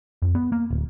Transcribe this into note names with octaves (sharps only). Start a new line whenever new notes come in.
F2
B3
A#3
D1